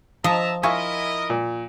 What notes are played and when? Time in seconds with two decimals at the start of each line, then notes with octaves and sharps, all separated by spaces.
0.24 F3 D#5 E5 A5 A#5
0.63 E4 F4 A#4 D#5 E5 G#5 C#6
1.30 A#2